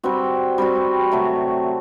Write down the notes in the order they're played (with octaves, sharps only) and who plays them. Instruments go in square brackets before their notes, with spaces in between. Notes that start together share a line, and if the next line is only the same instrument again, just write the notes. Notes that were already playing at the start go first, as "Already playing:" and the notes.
[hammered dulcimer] G3 C4 F#4
G3 C4 F#4
C3 F#3 A3